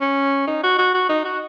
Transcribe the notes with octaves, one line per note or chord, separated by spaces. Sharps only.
C#4
D#4
F#4
F#4
F#4
D#4
F#4